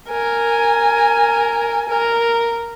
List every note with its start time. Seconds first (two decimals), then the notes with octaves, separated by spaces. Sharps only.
0.11 A#4 G#5
1.89 A#4